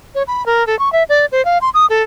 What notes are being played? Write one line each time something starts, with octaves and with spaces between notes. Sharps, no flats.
C#5
B5
A#4
A4
C#6
E5
D5
C5
F5
C6
D#6
A4